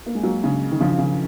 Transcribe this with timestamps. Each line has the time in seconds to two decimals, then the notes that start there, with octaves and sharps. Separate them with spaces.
0.06 A#3
0.15 G#3
0.23 F#3 A#3
0.44 C#3
0.71 D#3
0.80 C#3 F3
0.98 C#3